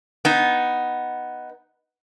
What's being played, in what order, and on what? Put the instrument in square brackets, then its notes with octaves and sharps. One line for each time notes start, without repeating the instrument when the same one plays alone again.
[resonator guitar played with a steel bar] B3 D#4